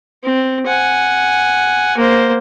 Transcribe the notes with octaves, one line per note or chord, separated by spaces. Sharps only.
C4
F#5 G#5
A#3 C5